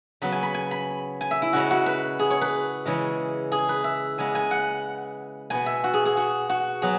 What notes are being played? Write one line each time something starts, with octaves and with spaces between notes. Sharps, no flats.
C#3 F#3 B3 B5
G#5
B5
G#5
B5
G#5
E5
E4
C#3 G#3 C#4 F#4
F#4
B4
G#4
C#5
B4
C#3 E3 G#3 C#4
G#4
B4
E5
C#3 G#3 B3 G#5
G#5
F#5
B2 B3 G#5
E5
F#4
G#4
G#4
F#4
F#4
F#3 B3 G#4